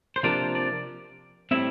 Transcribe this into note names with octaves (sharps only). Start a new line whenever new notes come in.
C5
C3 F3 A#3 D4 F4 D5
D5
A2 G3 C4 E4 E5